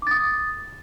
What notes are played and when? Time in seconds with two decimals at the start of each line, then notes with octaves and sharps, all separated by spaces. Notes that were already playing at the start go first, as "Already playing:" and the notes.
0.02 D6
0.07 A6
0.11 D#6